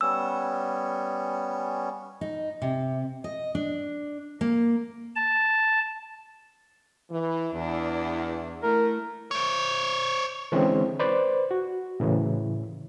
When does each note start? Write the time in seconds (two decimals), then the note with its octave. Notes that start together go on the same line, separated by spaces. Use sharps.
0.01 G3 B3 C#4 E6
2.21 D#4
2.62 C3
3.24 D#5
3.55 D4
4.41 A#3
5.15 A5
7.11 E3
7.53 E2 D4 E4
8.63 A3 E4 A#4
9.31 C5 C#5
10.52 D3 E3 G#3 C4 C#4
11.00 B4 C5 D5
11.51 F#4
12.00 A2 C#3 E3